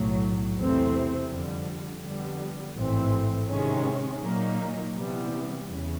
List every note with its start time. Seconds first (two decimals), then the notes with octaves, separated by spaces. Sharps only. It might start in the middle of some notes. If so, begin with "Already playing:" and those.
Already playing: B1 A2 F#3
0.57 E2 C3 E3 A3 C4
1.29 F2 D3 G3
2.03 F2 D3 G3 B3
2.75 A1 G#2 E3 A3 C4
3.48 C3 D#3 G#3 C#4
4.22 A#2 F#3 A#3 D#4
4.95 C3 E3 G3 B3
5.67 E2 C#3 E3